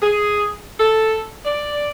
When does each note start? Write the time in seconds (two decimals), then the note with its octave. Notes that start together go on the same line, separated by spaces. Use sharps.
0.02 G#4
0.79 A4
1.45 D5